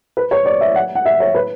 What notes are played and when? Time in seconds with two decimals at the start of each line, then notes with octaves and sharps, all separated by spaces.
0.17 B4
0.31 C#5
0.46 D5
0.61 E5
0.76 F#5
0.95 F#5
1.06 E5
1.20 C#5
1.35 B4